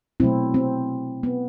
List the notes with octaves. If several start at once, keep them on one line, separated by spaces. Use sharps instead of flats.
B2 F#3 A3 C4 E4
C4
B3